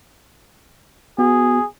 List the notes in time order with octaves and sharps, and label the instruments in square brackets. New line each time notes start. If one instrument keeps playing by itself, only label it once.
[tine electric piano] B3 F#4 [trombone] G#4